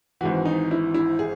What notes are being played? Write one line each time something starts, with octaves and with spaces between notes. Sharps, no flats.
G#1 G#2 E3 F#4
D#4
E4
E4
G#4